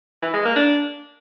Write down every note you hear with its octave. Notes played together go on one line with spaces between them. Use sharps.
E3
G#3
A#3
D4